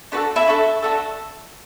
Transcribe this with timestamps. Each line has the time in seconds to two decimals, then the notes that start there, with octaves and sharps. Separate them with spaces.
0.12 D4 F#4 A4 B4
0.36 E4 E5
0.47 D4 F#4 A4
0.82 D4 F#4 A4